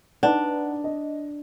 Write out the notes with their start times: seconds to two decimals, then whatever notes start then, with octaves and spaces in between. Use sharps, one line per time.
0.23 D4 D#4 B4 F#5
0.84 D#5